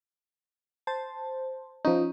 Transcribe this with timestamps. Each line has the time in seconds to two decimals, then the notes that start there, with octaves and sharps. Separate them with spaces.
0.87 C5 A5
1.85 F3 C#4 D#4